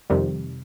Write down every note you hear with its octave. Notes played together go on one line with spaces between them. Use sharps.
F2 C3 D#3 G3